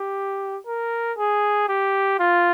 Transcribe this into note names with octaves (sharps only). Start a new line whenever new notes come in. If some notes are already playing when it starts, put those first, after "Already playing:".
Already playing: G4
A#4
G#4
G4
F4